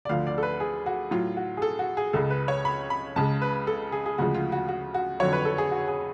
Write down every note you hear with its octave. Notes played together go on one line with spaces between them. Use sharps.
D5
D2 D3 F3 F5
D5
A4
B4
G#4
F#4
A2 F#3 F4
F#4
G#4
A4
F#4
G#4
C#2 C#3 G#3 A4
B4
C#5
B5
B5
C#2 C#3 G#3 A5
B4
A4
G#4
G#4
D2 C#3 F3 G#3 F#4
F4
F#4
F#4
F#4
F2 D3 F#3 C#5
B4
A4
G#4
F#4
G#4